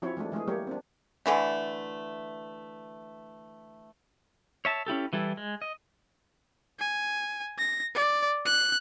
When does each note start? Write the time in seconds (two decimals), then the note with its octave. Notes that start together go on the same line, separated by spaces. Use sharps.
0.02 F3 C4 E4 F#4 C#5
0.17 E3 G#3 A3 D4
0.32 E3 G#3 A3 G#4
0.47 F#3 G3 A3 A#3 G4 C#5
0.67 C4 D4
1.26 D3 E3 A3
4.65 C#5 E5 A5
4.86 C#4 E4 G4 A4
5.13 E3 G3 E4 A4
5.37 G#3
5.62 D#5
6.79 G#5
7.58 A#6
7.95 D5
8.45 F#6